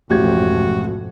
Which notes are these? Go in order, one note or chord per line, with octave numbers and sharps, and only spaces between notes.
A1 F2 G#2 B2 F#4 G4 G#6